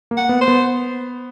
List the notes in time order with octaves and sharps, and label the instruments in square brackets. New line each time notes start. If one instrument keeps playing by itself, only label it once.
[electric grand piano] A#3
[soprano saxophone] F#5
[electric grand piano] B3
[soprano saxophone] C5
[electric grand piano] B3